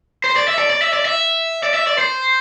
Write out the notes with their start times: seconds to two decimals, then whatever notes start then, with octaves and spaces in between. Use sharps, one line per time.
0.24 C5
0.36 D5
0.48 E5
0.59 D5
0.70 D5
0.82 E5
0.93 D5
1.05 E5
1.63 D5
1.74 E5
1.87 D5
1.98 C5